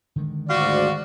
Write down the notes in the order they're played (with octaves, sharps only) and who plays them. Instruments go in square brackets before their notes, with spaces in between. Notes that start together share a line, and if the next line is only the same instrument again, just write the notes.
[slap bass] D3 D#3 G#3
[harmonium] D2 G#2 D5 [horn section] F4 F#4